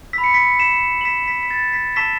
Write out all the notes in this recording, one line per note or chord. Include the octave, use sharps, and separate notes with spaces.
B5 E6 B6
C#7
B6
B6 E7
F#7
B6 E7
B6
B6
A6
B6
A5 C#6 E6 B6 E7